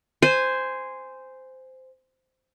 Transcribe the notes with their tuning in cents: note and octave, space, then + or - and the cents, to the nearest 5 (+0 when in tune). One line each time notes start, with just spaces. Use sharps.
C5 -10 G#5 -10